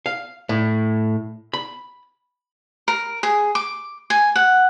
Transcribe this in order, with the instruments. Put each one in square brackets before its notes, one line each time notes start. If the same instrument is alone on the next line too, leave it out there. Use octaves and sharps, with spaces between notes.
[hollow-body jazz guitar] F5
A2
B5
[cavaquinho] A#4
G#4
D6
G#5
F#5